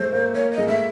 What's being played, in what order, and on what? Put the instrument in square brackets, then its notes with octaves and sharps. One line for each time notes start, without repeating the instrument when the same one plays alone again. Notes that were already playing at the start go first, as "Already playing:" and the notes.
Already playing: [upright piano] G#3 A3 [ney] C5
[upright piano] A#3
[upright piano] A#3 [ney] C#5
[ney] D#5
[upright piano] G#3
[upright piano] A3 [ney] E5